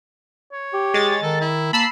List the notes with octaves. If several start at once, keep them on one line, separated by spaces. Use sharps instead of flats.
C#5
G4
G#3 A6
D#3 A4
E4
A#3 A5 B5 E6 C7